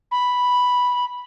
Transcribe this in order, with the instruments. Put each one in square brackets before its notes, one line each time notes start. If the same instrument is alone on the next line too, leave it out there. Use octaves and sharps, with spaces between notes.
[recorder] B5